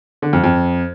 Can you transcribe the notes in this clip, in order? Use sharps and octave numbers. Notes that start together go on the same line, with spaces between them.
D3
F2
F2